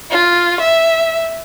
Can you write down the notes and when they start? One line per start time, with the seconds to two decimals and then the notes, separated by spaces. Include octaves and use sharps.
0.11 F4
0.61 E5